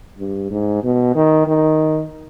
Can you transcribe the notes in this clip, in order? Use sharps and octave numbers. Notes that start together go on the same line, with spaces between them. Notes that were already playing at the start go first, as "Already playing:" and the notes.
G2
G#2
B2
D#3
D#3